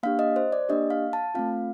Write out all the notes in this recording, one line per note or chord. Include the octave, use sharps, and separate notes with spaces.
A#3 D4 G4 F5
D#5
C5
D5
A#3 D4 G4 D#5
F5
A5
A3 C4 F4 F5